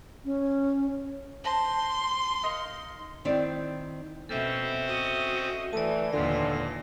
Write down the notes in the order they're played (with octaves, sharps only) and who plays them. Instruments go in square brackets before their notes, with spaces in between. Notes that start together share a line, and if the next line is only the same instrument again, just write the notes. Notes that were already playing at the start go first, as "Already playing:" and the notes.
[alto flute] C#4
[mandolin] C5 A5 A#5 [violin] C6
[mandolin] D#4 A#4 F5
[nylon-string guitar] D#3 C4 E4 D5
[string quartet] B2 [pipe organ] C4 C#4 C5 [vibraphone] A4 E5
[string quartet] F#4 D#5
[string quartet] E3 [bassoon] A3 [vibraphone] D5 A5
[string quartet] D#2 E3 F4 [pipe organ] A#2 A#6 [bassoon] D3